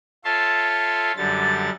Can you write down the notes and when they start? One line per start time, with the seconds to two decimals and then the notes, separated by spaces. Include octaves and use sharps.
0.24 F4 A4 C#5 E5 A5 C6
1.17 F#2 D3 G3 A6